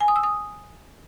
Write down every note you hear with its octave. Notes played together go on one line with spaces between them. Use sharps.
G#5
D#6
E6
D#6